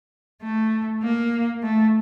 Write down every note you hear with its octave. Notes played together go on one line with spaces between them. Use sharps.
A3
A#3
A3